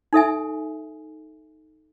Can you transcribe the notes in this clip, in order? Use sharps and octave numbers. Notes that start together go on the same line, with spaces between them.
D#4 A4 E5 G#5